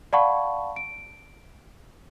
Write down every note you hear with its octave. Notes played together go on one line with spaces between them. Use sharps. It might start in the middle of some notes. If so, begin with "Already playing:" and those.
D5 F5 F#5 A5 B5 C#6
D7